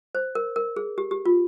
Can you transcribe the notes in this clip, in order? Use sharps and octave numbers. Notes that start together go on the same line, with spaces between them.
C5
A#4
A#4
G#4
G4
G4
F4